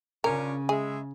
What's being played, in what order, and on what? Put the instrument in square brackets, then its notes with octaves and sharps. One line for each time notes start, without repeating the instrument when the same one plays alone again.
[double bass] C#3 [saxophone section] C#4 D4 F4 [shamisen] A#4
[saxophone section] G#3 E5 [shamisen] G#4